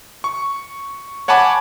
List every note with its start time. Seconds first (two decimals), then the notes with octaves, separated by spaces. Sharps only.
0.24 C#6
1.28 C#5 F#5 G#5 A5 B5 D6